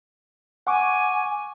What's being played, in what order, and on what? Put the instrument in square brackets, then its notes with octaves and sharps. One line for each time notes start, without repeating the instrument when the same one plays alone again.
[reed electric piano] F#5 C#6 D6 [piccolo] G#5